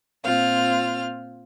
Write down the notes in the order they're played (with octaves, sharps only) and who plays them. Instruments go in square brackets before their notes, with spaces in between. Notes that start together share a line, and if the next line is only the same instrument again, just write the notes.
[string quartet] A#2 C4 F4 F6